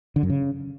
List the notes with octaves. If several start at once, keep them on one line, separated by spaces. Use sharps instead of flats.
D3
F#2
C#3